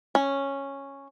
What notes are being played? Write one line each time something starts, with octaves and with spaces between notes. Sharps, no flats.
C#4